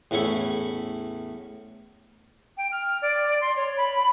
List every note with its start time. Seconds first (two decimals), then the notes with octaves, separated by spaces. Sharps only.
0.11 E2 A2 C#4 E4 C#6
2.57 G5
2.72 F6
3.02 D5
3.41 C6
3.56 C#5
3.77 B5